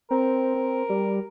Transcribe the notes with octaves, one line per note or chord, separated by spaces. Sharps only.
C4 A#4
C4
G3